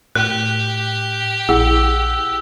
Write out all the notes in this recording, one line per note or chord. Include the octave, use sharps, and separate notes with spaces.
A2 G4 F#6
A#1 E4 G#4 F#5 E6